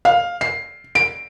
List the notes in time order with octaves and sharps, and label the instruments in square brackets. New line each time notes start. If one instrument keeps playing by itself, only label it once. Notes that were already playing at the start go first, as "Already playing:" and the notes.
[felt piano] F5
C7
D7